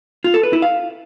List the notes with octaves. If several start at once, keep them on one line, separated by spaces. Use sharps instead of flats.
F4
A4
B4
E4
F5